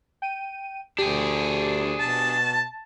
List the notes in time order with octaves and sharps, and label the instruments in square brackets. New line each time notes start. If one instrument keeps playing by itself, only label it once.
[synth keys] G5 D#7
[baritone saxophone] D2 [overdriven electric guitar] D4 G#4 [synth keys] G4
[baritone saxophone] B2 [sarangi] A5